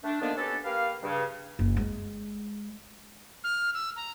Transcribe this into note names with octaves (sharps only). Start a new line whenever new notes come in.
A3 D4
D3 D#3 F3 A#3 B3 D4
B2 B3 C#4 G4 A4
A#3 G4 B4 F5
G2 C#3
F#1
G#3
F6
E6
A#5